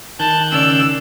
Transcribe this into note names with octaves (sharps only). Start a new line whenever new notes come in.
D#3 A5 F#6 G6
C#3 D5 E6